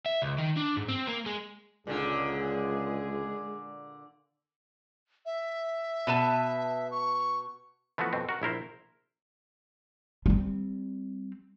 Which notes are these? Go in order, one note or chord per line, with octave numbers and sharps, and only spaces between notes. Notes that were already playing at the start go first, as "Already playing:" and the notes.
E5
C#2
D#3
D4
G#2
C4
A#3
G#3
C#2 A#2 D3 G#3 G#4
E5
B2 B4 A5
C#6
E3 F3 A3 B3 F#4
F2 B2 C4
F#4 A#4
A#1 E4 A#4 C5
G3 C4